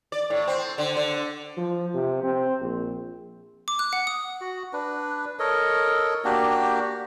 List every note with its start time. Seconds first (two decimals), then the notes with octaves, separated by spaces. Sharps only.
0.12 D5
0.30 A2
0.48 C4
0.78 D3
0.97 D3
1.57 F3
1.94 C3
2.24 C4
2.61 A#1
3.68 D6
3.79 F#6
3.93 F#5
4.07 D#6
4.41 F#4
4.73 D4 B4
5.39 A4 A#4 C#5 D#5
6.25 A#3 D4 F#4 G4